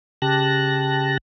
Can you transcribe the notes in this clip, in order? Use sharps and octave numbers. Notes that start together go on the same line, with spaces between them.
C#3 G4 A5 F#6 A#6